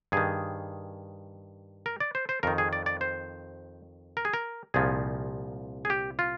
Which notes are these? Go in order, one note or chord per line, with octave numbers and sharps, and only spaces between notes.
G2 D#3 G#4
A#4
D5
C5
C5
F2 D#3 A#4
G#4
D5
D5
C5
A#4
G#4
A#4
C2 A#2 F3 G#4
G#4
G4
F4